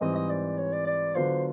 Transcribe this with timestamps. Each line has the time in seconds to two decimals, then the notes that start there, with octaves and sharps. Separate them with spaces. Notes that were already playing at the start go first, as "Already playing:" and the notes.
0.01 G#2 E3 G3 C4 D#5
0.15 D#5
0.30 D5
0.58 C#5
0.73 D5
0.87 D5
1.15 D3 F#3 B3 D4 F4 C5